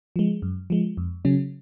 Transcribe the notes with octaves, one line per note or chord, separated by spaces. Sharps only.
F3 G#3
F#2
F3 G#3
F2
C#3 F#3 C#4